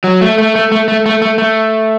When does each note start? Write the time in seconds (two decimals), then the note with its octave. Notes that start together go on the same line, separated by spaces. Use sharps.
0.04 F#3
0.21 A3
0.38 A3
0.55 A3
0.72 A3
0.88 A3
1.06 A3
1.22 A3
1.38 A3